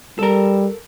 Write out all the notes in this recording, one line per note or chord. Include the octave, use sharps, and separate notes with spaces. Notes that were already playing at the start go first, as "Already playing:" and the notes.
G3 A4 A#4